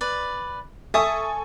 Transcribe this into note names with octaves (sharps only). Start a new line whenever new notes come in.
B4 D5
A4 E5 G#5 C#6 D#6